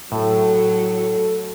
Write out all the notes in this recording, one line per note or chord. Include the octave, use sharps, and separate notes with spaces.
A2 F#3 A4